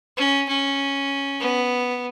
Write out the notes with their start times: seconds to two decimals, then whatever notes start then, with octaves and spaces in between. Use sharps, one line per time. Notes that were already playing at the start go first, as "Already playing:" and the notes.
0.17 C#4
0.48 C#4
1.40 B3